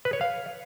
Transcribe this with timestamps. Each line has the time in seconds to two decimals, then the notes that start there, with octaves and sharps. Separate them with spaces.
0.05 B4
0.13 C#5
0.21 F5